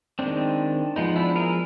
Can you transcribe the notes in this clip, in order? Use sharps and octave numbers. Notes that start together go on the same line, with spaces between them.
D#3 G#3 C4 D4
F3 G#3 B3 D#4
D4 E4
G#4 A#4